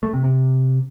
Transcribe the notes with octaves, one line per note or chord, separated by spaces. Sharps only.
A3
C3
C3